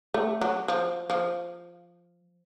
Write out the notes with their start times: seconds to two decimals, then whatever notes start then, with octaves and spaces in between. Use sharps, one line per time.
0.14 A3
0.41 F#3
0.68 F3
1.10 F3